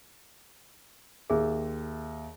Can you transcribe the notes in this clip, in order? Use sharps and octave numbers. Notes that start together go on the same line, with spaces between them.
D#2 G#4 E5